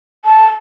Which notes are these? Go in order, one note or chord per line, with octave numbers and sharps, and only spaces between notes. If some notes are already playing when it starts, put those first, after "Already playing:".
A5